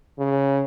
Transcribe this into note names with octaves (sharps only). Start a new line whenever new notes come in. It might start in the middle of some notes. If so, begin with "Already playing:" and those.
C#3